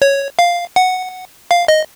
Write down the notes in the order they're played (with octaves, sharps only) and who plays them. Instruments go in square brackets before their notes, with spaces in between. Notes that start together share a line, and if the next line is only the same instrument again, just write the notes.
[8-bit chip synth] C#5
F5
F#5
F5
D#5